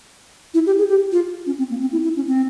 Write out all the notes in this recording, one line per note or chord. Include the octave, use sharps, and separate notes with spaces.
E4
G4
G#4
G4
F4
C#4
C4
A#3
C4
E4
E4
C#4
C4